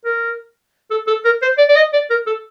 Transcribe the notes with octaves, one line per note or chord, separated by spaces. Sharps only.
A#4
A4
A4
A#4
C5
D5
D5
D#5
D5
A#4
A4